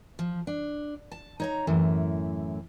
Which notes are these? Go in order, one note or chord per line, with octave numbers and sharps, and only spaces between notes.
F3
D4
A5
D#4 C#5 A#5
F#2 A2 E3